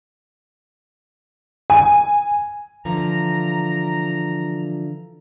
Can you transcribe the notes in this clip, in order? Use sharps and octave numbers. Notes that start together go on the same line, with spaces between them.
G#5
D3 E3 F3 A#5